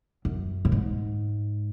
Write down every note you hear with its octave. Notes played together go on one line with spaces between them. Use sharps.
F#2
A2
G#2